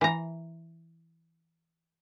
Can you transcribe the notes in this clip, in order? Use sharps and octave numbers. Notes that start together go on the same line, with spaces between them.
E3 A#5